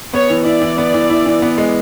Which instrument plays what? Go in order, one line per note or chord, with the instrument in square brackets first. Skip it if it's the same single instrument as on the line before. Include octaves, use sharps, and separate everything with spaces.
[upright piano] B3 [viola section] C#5
[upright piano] E3
[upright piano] E4 [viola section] D5
[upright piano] E3
B3
E3
E4
E3
B3
G#3